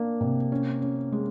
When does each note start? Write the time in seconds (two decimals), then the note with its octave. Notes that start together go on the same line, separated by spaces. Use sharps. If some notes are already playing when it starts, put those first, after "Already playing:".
Already playing: A#3 D4
0.21 C3
0.52 C#4
0.82 C#4
1.12 G#3